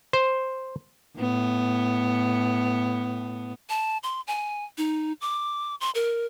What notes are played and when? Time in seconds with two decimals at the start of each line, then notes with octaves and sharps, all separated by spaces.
0.13 C5
1.19 A2 B3
3.70 A5
4.03 C6
4.27 G#5
4.78 D#4
5.21 D6
5.81 C6
5.95 A#4